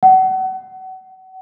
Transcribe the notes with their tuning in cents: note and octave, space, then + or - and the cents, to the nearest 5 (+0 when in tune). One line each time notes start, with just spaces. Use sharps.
F#5 +30